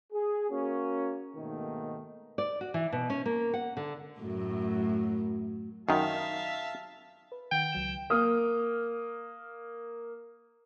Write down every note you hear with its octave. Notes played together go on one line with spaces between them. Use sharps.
G#4
A#3 C#4 F#4
G#2 B2 D#3 A3 A#3 D#4
D5
F#4
E3
B2
C#4
A#3
F#5
D3
F#2 A2 A3
F#2 D#3 E5 F5 A5
B4
D#3 F#5 G5
C#2 F#3 E7
A#3 D#6 F6